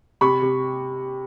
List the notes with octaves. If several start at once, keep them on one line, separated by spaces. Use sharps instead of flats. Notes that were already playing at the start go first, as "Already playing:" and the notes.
C3 B5 C#6
C3